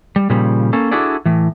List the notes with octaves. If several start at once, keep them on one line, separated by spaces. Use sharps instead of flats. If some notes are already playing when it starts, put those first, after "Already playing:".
G3
A#2 C#3 F3 G3
A#3 C#4 A4
D4 E4 F#4 G#4 A4 D5
A2 E3